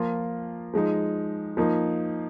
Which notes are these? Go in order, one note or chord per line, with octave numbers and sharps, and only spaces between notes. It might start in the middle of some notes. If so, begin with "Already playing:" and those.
Already playing: F3 A#3 F4
F3 G#3 D#4
F3 A#3 D#4